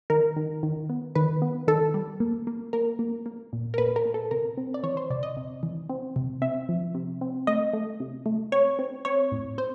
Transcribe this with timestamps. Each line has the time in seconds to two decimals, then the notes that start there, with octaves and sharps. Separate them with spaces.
0.10 D#3 A#4
0.36 D#3
0.63 D#3
0.89 B3
1.15 D#3 B4
1.42 B3
1.67 D#3 A4
1.94 G3
2.20 A#3
2.47 A#3
2.73 A#3 A#4
2.99 A#3
3.26 A#3
3.53 A#2
3.74 A#4
3.78 A#2 B4
3.96 A#4
4.05 A#2
4.14 A4
4.31 C3 A#4
4.57 C4
4.74 D5
4.83 E3 C#5
4.97 C5
5.10 C3 D5
5.23 D#5
5.37 C3
5.63 E3
5.89 C4
6.16 C3
6.42 C4 E5
6.69 F3
6.94 C3
7.21 C4
7.47 A3 D#5
7.73 A3
8.00 C3
8.26 A3
8.52 C4 C#5
8.79 C4
9.05 C4 C#5
9.32 A2
9.58 C4 C5